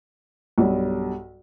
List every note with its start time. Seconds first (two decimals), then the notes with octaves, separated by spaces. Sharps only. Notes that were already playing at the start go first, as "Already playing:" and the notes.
0.58 B1 G2